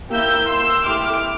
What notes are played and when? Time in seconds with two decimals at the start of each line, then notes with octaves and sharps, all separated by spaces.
0.12 A#3 E4 G4 E6 G6
0.48 C6 E6
0.85 A3 E4 G4 D6 F6